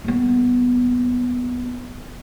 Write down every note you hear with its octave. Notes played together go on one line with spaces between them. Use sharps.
D#1 B3